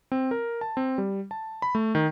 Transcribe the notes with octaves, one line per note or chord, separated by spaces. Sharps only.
C4
A#4
A5
C4
G3
A5
B5
A3
D#3